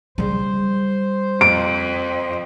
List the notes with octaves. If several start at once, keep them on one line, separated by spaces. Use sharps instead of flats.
C#3 G3 C5
F2 D7